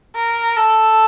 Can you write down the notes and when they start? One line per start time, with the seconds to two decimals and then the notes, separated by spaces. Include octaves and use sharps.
0.15 A#4
0.57 A4